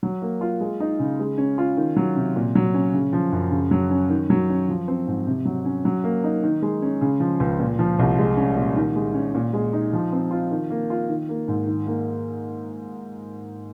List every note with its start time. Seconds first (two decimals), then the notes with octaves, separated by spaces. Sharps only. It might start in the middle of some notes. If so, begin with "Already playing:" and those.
0.03 F#3
0.22 A#3
0.41 F4
0.60 G#3
0.80 D#4
0.99 C#3
1.19 G#3
1.38 C#4
1.58 F4
1.77 D#3
1.96 F#3
2.16 C3
2.36 A#2
2.55 F#3
2.74 C#4
2.93 C#3
3.13 F3
3.32 F#2
3.51 C#3
3.71 F#3
3.91 C#4
4.09 D#3
4.30 F#3
4.49 C#4
4.69 F3
4.88 C4
5.07 G#2
5.27 C3
5.45 F#3
5.65 C#4
5.85 F#3
6.04 A#3
6.24 D#4
6.43 D#3
6.62 G#3
6.82 C#4
7.01 C#3
7.20 F3
7.40 C#2
7.60 A#2
7.79 F3
7.99 C2
8.18 G#3
8.37 C#4
8.56 A#2
8.76 D#3
8.95 G#3
9.14 C#4
9.35 A#2
9.53 G#3
9.73 D#4
9.93 F3
10.13 C4
10.31 F4
10.51 D#3
10.70 A#3
10.90 F4
11.09 D#3
11.29 A#3
11.48 G#2
11.67 D#3
11.87 A#3